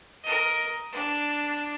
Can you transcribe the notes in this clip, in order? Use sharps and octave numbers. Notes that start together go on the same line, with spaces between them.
A#4 D#5
D4